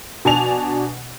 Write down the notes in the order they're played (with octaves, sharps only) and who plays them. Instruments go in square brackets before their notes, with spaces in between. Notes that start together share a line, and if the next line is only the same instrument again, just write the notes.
[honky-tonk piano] B2 D4 G#5 A5 F7